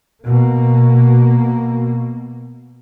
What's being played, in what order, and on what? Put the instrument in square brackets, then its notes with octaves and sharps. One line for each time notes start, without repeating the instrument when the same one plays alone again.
[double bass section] B2 A#3